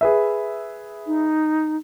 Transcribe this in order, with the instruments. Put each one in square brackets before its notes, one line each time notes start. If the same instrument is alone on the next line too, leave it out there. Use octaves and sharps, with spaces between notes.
[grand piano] G#4 B4 E5
[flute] D#4